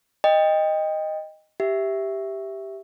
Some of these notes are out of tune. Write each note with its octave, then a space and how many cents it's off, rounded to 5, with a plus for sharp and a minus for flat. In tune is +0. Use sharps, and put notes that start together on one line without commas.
D#5 +0 G5 +20
G4 +0 E5 +0